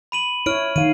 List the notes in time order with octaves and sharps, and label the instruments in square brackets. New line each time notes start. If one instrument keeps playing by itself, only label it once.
[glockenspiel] B5 D#7 F#7
[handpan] E4 C#5 [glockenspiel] F6 D7
[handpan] D#3 F5 [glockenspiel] D#7